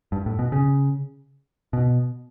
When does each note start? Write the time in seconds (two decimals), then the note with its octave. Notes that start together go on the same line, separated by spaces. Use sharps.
0.12 G2
0.26 A2
0.39 B2
0.52 C#3
1.73 B2